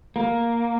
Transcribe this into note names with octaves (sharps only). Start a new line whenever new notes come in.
A#3